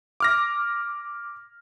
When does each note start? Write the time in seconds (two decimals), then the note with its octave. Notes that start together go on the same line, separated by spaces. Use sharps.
0.20 D6 F6 A#6